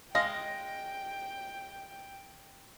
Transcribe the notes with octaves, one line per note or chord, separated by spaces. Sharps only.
G#3 D#5 F5 G5 A#6